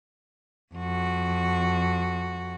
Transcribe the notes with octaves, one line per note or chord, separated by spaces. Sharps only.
F2 F#4